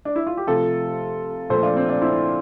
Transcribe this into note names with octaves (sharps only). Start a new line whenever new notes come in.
D4
E4
F4
G4
C3 F3 A3 F4 A4
A#2 F3 A3 A4 C5
D4 F4
C4
D4
C4 E4